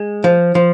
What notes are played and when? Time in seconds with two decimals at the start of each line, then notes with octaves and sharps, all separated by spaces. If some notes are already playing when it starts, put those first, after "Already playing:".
Already playing: G#3
0.24 F3
0.55 F3